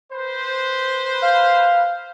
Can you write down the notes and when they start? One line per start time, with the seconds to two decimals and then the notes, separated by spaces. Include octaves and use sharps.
0.12 B4 C5
1.23 F5